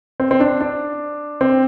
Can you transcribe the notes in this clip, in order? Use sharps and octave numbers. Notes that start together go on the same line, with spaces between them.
C4
C4
D4
D4
C4